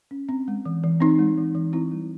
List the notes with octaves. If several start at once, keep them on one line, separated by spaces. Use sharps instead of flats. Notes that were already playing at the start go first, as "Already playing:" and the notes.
C#4
C4
G#3
E3
E3
C4 D#4
G#3
E3
E3
C4 E4
G3